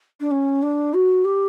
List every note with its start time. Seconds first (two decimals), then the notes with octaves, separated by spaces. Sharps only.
0.20 D4
0.31 C#4
0.62 D4
0.93 F#4
1.24 G4